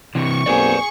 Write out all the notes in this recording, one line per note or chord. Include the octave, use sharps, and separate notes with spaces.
C3 E3 C#6
B1 A#3 C4 G#4 B4 D5